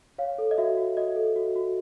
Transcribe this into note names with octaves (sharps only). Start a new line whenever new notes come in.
C#5 F5
A4
D#5
F#4 E5
F#4
F#4 D#5
A4
F#4
F#4